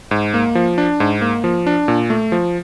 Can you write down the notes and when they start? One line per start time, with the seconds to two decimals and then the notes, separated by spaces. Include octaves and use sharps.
0.11 G#2
0.34 A#3
0.55 F3
0.78 D4
1.00 G#2
1.21 A#3
1.44 F3
1.67 D4
1.88 A#2
2.10 A3
2.32 F3